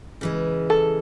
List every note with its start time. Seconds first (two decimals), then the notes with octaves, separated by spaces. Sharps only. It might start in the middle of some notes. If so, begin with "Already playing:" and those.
0.21 C#3 E3 G#3
0.70 A4